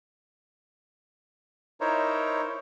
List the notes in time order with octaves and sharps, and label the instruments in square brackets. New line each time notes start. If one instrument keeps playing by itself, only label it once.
[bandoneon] D#4 E4 A#4 C5 C#5